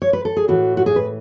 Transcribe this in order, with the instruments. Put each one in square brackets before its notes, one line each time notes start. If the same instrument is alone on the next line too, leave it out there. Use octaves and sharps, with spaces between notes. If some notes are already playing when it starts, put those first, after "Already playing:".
[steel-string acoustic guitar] C#5
B4
A4
G#4
A2 E3 F#4
F#4
G#4
B4